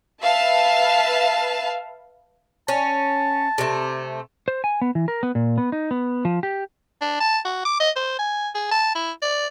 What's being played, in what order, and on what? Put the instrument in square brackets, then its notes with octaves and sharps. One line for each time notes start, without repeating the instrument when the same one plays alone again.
[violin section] B4 E5 F5 A5
[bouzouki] C#4 [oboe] A5
[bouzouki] C3 A3
[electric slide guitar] C5
G#5
B3
E3
A#4
B3
A#2
B3
D#4
B3
F3
G4
[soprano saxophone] D4
A5
F#4
D6
D#5
C5
G#5
G#4
A5
E4
D5